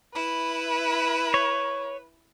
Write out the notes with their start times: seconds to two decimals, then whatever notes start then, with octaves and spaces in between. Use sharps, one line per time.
0.14 E4 B4
1.34 C#5